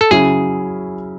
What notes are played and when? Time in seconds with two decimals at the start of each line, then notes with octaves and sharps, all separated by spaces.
0.01 A4
0.11 C#3 F#3 C#4 E4 G#4